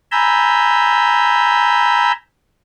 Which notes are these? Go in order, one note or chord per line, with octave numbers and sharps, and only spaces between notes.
G#5 A#5 B5 E6 G6